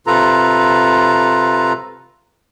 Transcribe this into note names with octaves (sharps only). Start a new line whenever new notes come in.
C3 F4 A4 B4 A#5